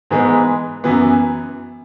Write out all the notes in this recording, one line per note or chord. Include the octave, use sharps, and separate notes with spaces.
G#2 E3 G#3 B3
F#2 E3 B3